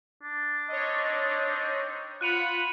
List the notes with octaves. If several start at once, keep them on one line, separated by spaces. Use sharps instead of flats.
D4
C4 D#4 C#5 D#5
F4 C5 F#5 B5 F#6 D#7 F7